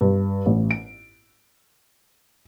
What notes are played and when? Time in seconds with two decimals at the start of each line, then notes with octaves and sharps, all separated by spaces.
0.01 G2
0.46 A1
0.71 D7